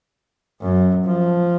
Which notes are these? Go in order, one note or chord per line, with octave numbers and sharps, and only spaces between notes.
F#2
F3